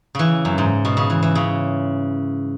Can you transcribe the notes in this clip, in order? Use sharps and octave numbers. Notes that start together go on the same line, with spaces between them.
C#3 E3
F#2
G#2
B2
C#3
E3
E3
C#3